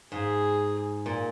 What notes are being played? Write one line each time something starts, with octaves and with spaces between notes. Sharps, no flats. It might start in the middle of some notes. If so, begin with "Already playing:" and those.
G#2 G#4
A#2